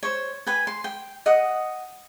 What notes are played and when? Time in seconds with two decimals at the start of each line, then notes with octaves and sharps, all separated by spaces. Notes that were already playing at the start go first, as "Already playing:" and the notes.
0.03 C5 C#5
0.47 B4 G5 G#5
0.67 C6
0.84 G5
1.26 D#5 F#5 D#6